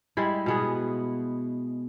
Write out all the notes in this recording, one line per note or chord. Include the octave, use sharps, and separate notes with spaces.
G3 G#3 E4
B2 B3 G#4